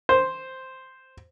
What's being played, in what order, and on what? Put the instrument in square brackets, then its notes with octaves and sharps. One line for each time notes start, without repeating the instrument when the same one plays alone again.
[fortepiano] C5